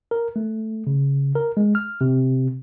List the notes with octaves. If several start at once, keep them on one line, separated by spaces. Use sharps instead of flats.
A#4
A3
C#3
A#4
G#3
F6
C3